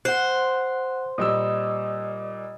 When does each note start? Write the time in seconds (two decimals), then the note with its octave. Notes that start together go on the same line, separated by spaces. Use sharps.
0.05 C5 F#5 F#6
1.18 A#2 G3 D#5 D#6 E6